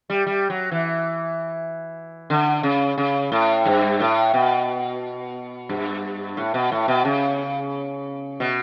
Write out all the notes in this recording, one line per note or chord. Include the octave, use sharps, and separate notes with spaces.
G3
G3
F#3
E3
D3
C#3
C#3
A2
G2
A2
B2
G2
A2
B2
A2
B2
C#3
B2